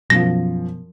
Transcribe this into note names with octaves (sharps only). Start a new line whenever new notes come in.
F#2 B2 F3 A#6